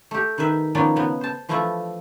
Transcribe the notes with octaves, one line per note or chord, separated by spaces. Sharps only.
A3 G4
D#3 E4 B4 E5
D#3 F3 B3 C#4 D5
C#3 B3
C5 A5
E3 F3 A3 D4 E4 F4